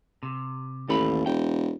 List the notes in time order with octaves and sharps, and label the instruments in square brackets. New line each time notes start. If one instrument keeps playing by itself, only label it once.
[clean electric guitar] C3
[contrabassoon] A1 [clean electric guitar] D#2 A4 B5
[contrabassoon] E1 [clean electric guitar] G5